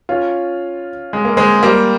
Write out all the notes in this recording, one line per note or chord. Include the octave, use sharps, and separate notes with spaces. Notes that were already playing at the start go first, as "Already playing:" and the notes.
C#4 F4
G#3
A#3
G#3 C4
G3 A#3